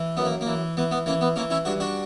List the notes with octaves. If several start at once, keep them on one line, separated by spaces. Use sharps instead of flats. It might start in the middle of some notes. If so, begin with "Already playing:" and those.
Already playing: E3
F#2 B3
A#3
A#3
E3
E3 B3
B3
E3 A#3 C#4
B3
E3 A#3 C#4
C#4 E4
G2 D4 F#4
D4 F#4